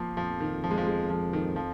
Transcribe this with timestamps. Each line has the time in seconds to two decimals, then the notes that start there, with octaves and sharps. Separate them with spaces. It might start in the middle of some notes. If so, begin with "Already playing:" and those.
Already playing: F3 A#3
0.17 F2 F3
0.40 D#3
0.64 F3
0.71 G#3
0.78 F3
0.87 G#3
1.10 F3
1.33 D#3
1.56 F3